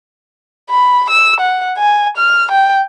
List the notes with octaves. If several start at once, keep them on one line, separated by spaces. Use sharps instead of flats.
B5
E6
F#5
G#5
F6
G5